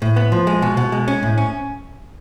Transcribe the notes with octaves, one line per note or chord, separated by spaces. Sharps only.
A2
B3
F3
G#3
B2
B2
G#3
C#4
A2
C#4